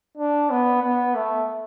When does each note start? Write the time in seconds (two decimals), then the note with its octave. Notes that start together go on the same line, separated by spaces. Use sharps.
0.18 D4
0.50 B3
0.82 B3
1.15 A3